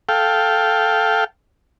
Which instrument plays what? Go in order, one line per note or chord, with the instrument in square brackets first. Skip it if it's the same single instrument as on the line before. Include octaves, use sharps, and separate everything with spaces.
[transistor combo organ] A4 F5 G5